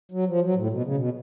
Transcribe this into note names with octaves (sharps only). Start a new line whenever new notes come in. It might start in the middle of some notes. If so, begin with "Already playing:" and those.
F#3
F3
F#3
A2
B2
C#3
B2